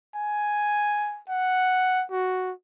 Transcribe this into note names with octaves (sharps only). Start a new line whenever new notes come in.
G#5
F#5
F#4